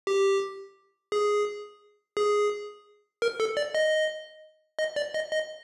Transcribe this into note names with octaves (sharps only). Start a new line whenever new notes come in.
G4
G#4
G#4
A#4
A4
D5
D#5
D#5
D5
D#5
D#5